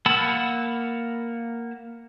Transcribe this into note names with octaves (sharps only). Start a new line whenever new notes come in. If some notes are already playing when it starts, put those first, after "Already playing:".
A#3 F#5 A5 B5 E6